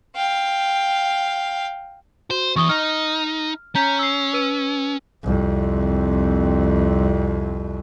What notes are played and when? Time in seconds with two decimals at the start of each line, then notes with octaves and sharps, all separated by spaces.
0.16 F5 G5
2.30 F#4 C5
2.56 E2 E3 C#6 D#6 G7
2.69 D#4 F6
3.75 C#4 A#5 G6 B6
3.99 E6 C7
4.33 B4 E6 D#7
5.23 C2 F2